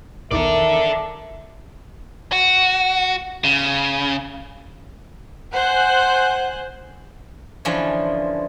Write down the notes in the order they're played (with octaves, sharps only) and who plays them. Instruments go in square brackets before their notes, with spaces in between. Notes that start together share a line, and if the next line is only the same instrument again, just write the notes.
[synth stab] A#1 E2 D#3 [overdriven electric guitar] A4 D5 [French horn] A#4 [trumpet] E5
[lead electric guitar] F#4
C#3
[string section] C5 G#5 F#6 [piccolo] F#5
[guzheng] D3 E3 F3 C#4